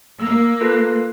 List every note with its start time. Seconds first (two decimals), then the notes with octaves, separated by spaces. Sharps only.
0.20 A#3 E6
0.61 F4 A4 B4